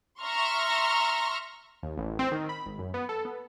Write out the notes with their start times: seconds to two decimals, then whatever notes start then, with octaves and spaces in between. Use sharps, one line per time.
0.21 E5 A#5 C6 C#6 F6
1.83 D#2
1.97 A1
2.19 C4
2.32 D#3
2.49 B5
2.66 G#1
2.79 F#2
2.94 B3
3.09 A4
3.25 B3